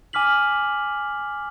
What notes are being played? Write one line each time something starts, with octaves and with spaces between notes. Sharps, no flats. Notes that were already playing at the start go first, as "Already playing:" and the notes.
G#5 D6 F6 B6 F#7